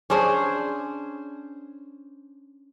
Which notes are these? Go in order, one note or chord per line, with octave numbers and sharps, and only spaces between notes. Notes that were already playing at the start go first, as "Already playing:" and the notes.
C#4 D4 G#4 C5